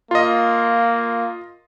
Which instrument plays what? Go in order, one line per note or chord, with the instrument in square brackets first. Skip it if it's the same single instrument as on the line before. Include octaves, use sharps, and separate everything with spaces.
[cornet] A#3 [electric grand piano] F4 D#5